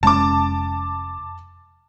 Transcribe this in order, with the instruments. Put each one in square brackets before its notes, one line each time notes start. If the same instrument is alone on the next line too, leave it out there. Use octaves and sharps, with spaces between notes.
[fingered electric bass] F1 G#3 C#4 [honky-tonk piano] A5 D6